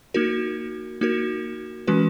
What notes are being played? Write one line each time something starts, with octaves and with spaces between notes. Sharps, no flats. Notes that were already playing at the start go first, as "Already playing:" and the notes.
A#3 D#4 F#4 A#4
A#3 D#4 F#4 A#4
E3 G#3 C#4 F#4 B4